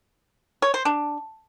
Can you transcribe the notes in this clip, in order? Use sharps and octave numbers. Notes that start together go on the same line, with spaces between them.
C#5
C5
D4